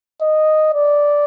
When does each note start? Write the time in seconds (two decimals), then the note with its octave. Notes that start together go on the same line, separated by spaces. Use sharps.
0.22 D#5
0.74 D5